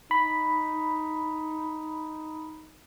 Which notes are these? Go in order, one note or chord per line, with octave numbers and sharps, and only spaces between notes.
D#4 B5